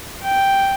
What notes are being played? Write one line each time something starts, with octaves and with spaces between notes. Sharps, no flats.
G5